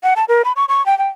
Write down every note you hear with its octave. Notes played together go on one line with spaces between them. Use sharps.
F#5
A5
A#4
B5
C#6
C#6
G5
G5